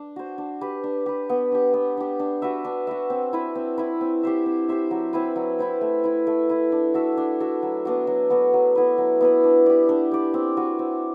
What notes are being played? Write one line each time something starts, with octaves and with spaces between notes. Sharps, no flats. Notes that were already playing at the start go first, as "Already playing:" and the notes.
Already playing: D4
F#4 C5
D4
G4 B4
D4
G4 B4
B3
D4 G4
B3
D4 G4
D4
F#4 B4 E5
D4
F#4 B4 E5
C4
E4 B4
C4
E4 B4
C4
G4 C5 E5
C4
G4 C5 E5
F#3
C4 E4 B4
F#3
C4 E4 B4
A3
E4 B4
A3
E4 B4
D4
F#4 A4 E5
D4
F#4 A4 E5
F#3
B3 D4 F#4
F#3
B3 D4 F#4
F#3
B3 E4 B4
F#3
B3 E4 B4
D4
G4 D5
D4
G4 D5
C4
F#4 B4
C4